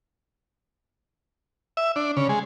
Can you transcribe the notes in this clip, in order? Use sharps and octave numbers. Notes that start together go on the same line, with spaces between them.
E5
D4
C#3
G#3